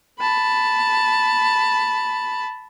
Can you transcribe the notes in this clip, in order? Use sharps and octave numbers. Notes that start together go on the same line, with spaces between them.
A5 B5